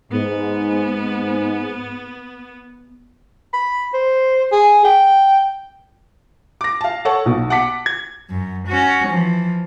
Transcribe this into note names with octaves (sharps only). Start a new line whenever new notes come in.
G#2 B3
B5
C5
G#4
G5
D6 A#6
F5 A5
A4 C#5 F#5 A5 C#6
B1 B2
F#5 A5 D6 B6 C#7
G#6
F#2
C#4 F#4
E3 F3